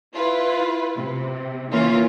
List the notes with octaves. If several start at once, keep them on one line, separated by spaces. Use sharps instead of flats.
E4 F4 B4
C3
E3 A#3 C#4 F4